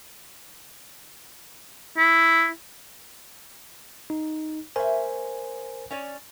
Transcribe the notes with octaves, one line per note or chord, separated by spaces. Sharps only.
E4
D#4
A3 A#4 C5 E5 G#5
C#4 C#5 D5